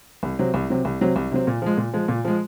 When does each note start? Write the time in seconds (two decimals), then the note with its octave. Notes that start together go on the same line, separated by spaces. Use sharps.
0.23 C2
0.39 C3 F#3 C4
0.54 C2
0.70 C3 F#3 C4
0.85 C2
1.01 C3 F#3 C4
1.16 C2
1.31 C3 F#3 C4
1.47 A#2
1.62 F3 G#3
1.77 A#2
1.93 F3 G#3
2.08 A#2
2.25 F3 G#3